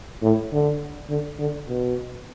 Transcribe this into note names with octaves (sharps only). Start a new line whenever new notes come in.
A2
D3
D3
D3
B2